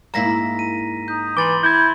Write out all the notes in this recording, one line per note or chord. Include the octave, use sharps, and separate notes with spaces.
G#2 A#3 E4 A#5 A#6 B6
D#7
D#4 G6
E3 C6 D6 A6 G7
E4 G6 G#6